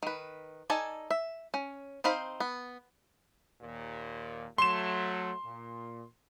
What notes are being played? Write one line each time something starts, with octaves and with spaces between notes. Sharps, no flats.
D#3 B4
D#4 A4 D5 G#5 A5
E5
C#4
C4 D#4 C5 F5 B5
B3
D#2 A#2
F#3 A3 C6 E7
A#2